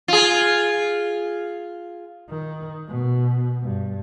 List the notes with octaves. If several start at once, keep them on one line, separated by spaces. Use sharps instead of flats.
F4 G#4
D#3
B2
G2